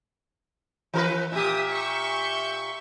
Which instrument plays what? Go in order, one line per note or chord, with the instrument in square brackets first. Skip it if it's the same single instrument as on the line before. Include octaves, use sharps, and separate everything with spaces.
[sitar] E3 A#4 B4
[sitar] A#2 G4 [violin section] E5 D#6
[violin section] E5 C#6 G6